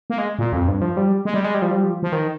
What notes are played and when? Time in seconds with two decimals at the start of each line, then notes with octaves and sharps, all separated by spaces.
0.10 A#3
0.18 G#3
0.39 A#2
0.53 F2
0.68 G2
0.82 F3
0.97 G3
1.25 G#3
1.34 G3
1.44 G#3
1.54 G3
1.62 F3
1.71 G3
1.84 F3
2.03 F3
2.12 D#3